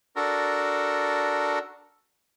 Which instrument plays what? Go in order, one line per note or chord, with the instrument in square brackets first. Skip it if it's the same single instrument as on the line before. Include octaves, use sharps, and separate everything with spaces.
[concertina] D4 F#4 A4 A#4